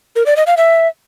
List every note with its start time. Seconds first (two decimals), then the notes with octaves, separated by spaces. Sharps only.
0.16 A#4
0.26 D5
0.36 D#5
0.47 F5
0.57 E5